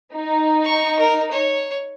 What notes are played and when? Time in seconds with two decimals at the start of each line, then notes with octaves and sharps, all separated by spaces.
0.15 D#4
0.64 C#6
0.98 A#4
1.31 C#5